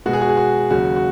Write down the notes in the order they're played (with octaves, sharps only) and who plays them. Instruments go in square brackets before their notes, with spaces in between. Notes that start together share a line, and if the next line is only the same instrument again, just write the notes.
[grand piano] B2 G#3 B3 F#4
G#4
F#4
G#4
F#4
D#2 C#3 F#3 F#4
F#4